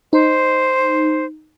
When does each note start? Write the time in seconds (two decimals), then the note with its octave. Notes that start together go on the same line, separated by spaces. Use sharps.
0.13 D#4 C5